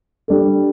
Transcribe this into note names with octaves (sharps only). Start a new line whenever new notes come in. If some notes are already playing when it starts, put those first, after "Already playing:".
G3 D4 A4